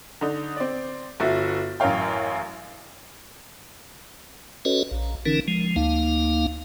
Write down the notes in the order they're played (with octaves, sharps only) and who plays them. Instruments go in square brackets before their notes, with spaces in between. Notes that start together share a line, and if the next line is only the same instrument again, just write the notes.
[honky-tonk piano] D3 D#4
C4 D5
G1 F#4 E5 A6
A1 F#2 A#4 C#5 F5 G5
[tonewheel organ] C#4 F#4 A4 B4 C#5 D#5
A#1
D3 E3 C#4 D#4 A#4
F3 G#3
D2 A#3 D#4 F5